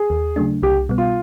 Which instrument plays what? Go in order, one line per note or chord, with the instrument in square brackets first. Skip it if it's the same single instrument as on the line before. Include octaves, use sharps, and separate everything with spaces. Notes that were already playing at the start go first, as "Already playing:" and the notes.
Already playing: [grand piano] G#4
[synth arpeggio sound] D#2
C#3 F#3 A3 D4
[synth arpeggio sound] C2 [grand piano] G4
[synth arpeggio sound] B2 G3 B3
[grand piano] F4